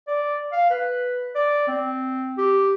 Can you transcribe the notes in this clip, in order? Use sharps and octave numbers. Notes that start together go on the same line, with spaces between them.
D5
F5
B4
D5
C4
G4